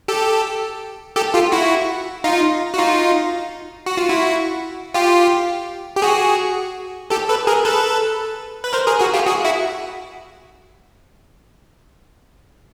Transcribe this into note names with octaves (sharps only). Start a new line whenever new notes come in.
G4 A4
G4 A4
F4 G4
E4 F#4
D#4 F4
F#4
D#4 F4
F#4
F4
E4 F#4
F4 G4
G4
F#4 G#4
G4 A4
A4 B4
G#4 A#4
A4 B4
B4
A#4 C5
G#4 A#4
F#4 G#4
F4 G4
F#4 G#4
E4 F#4